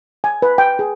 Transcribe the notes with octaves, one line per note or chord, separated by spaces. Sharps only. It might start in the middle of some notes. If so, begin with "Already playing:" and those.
G#5
B4
G5
G#4